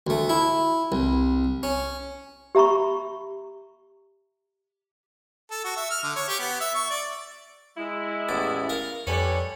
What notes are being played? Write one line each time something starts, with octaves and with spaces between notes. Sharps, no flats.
D2 A3
E4
C2
C#4
G4 E5 A#5 B5 C#6
A4
F#4
E5
F6
D3
C#5
G4
B3
E5
C#6
D5
G#3 E4
A1 E2 D6 A6
A#4 F5 A#5
F2 D3 G3 B4 C#5 G#5 C#7